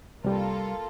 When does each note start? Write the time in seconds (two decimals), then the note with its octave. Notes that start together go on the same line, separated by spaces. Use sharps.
0.24 C2 G3 A#3 F4 A4